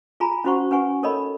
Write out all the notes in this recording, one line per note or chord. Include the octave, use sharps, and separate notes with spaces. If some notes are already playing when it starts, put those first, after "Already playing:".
F4 G#4 G#5 A#5 B5
C#4 E4 F#4 C5 F#5 C#6
C#4 B4 F#5 G#5 C#6
D#4 A4 A#4 C#5 D#5 B5